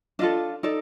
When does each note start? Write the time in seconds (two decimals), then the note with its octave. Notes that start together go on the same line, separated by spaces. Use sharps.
0.19 D4 F4 A4 D#5
0.63 D#4 A4 D5